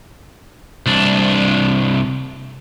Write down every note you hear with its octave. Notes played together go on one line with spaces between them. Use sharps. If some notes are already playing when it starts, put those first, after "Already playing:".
C2 D4